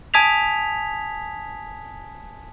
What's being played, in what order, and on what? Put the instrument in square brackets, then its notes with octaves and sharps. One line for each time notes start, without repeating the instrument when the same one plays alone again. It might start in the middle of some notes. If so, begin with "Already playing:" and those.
[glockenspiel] G#5 A5 D#6 G#6 B6 F7